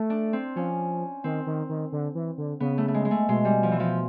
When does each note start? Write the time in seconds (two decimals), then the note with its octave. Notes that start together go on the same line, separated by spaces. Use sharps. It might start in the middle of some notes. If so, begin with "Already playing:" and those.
Already playing: A3
0.10 D4
0.33 C4
0.56 F3 C#4
1.24 D#3 C4
1.47 D#3
1.69 D#3
1.92 D3
2.15 E3
2.38 D3
2.60 C#3 B3
2.78 A3
2.88 A3
2.94 G#3
3.05 G#3
3.11 A3
3.29 B2 G#3
3.45 G3
3.63 F3
3.72 E3
3.80 F3